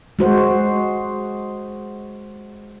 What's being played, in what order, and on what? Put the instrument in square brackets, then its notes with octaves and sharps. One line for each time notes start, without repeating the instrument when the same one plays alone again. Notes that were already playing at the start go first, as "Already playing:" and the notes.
[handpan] G#3 F#4 C5